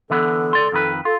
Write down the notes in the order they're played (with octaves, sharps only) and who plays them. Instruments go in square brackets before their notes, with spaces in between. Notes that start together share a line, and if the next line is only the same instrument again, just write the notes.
[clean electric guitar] D3 E3 B3 [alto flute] A4
[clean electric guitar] C#2 D5 C6
F2 D#3 B4
[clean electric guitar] F4 [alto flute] A4